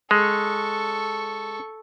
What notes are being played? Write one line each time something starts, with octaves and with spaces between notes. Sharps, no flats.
G#3 A4 C#6